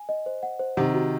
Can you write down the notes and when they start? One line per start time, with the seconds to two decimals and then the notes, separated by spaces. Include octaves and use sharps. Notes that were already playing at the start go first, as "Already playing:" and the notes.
Already playing: G#5
0.09 D#5
0.26 C5
0.43 F#5
0.59 C5
0.77 C3 D#3 F#5
0.94 F#4